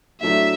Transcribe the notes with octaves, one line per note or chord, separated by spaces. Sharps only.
A2 F#3 A3 D4 E5